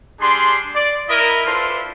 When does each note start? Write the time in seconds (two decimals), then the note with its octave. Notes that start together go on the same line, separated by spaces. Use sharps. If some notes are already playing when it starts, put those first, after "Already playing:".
0.20 G3 D4 G4 G#4 C6
0.76 D5
1.09 E4 A#4 D#5
1.46 D4 E4 F4 A4 B4 C5